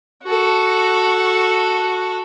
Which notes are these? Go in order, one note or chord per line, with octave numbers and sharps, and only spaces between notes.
F#4 A4